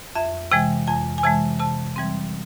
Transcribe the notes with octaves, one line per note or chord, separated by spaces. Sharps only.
F2 E5
C3 E3 G#3 G5
F2 G#5
G#5
C3 E3 G#3 A5
C3 A5
E3 G3 C4